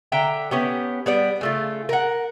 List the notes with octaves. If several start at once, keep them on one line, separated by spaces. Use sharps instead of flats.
D3 E5 G5 A#5
B3 C#4 G4
G3 B3 D5
C#3 A3 F4
A#4 F#5